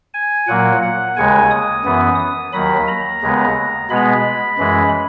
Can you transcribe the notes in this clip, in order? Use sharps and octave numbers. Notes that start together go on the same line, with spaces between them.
G#5
A#2 F#3 A#3 F#5
F#5
D#2 C#3 G#3 G#5
D#6
F#2 E3 B3
D#6
D#2 D#3 F#3 B5
A#5
D#2 C#3 G#3 B3
B2 G#3 B3 B5
F#2 E3 G#3